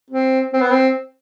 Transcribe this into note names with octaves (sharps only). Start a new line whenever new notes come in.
C4
C4
B3
C4